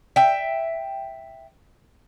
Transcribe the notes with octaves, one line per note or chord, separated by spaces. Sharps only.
E5 G5